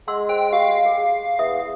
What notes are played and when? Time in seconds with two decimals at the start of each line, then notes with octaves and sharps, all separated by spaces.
0.08 G#3 F#5 C6 E6
0.29 C5 G5
0.52 G4 F5
0.85 G#4
1.39 E2 E5 D#6